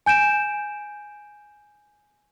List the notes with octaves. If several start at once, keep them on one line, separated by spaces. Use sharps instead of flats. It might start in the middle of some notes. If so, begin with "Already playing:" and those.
G#5 G6 D7 E7